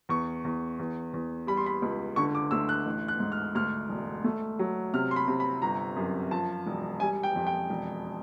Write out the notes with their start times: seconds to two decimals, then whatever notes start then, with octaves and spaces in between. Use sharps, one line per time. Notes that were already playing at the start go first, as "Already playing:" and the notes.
0.09 E2 C#6
0.45 E2
0.79 E2
1.14 E2
1.47 G3 B5
1.57 C6
1.66 B5
1.82 C#2
2.16 D3 C#6
2.35 D6
2.51 D2 E6
2.69 F#6
2.86 A1
3.08 F#6
3.20 G#2
3.32 F6
3.55 D2 F6
3.89 E1
4.24 A3
4.59 F#3
4.94 C3 F6
5.11 C6
5.16 B5
5.28 C3
5.40 B5
5.62 G1 A#5
5.96 F#2
6.31 F3 A5
6.66 E1
7.00 G3 G#5
7.23 G5
7.36 F2
7.47 G5
7.70 E1